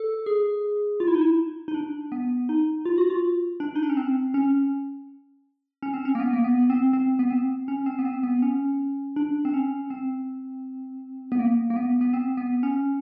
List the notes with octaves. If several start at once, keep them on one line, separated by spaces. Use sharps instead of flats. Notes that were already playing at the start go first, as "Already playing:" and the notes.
Already playing: A4
G#4
F4
E4
D#4
E4
D#4
D4
B3
D#4
F4
F#4
F4
D4
D#4
D4
C#4
C4
C#4
C#4
C4
C#4
A#3
B3
A#3
B3
B3
C4
C4
B3
C4
C#4
C4
B3
C4
B3
C#4
D4
C4
C#4
C4
B3
A#3
A#3
B3
B3
C4
B3
C#4